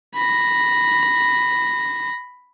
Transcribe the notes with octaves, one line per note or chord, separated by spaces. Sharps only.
B5 A#6